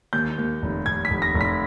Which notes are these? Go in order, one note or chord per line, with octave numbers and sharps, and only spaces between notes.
D#2 G6
D#2
F1
F1 G#6
B6
F1
A#6
F1
B6